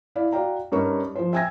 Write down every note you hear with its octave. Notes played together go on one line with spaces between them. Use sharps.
E4 D5 F5
F#4 D5 F5 G5 A#5
G2 C#4 D#4 A#4 C#6
F3 C5
E5 G5 G#5 E6 G#6 A#6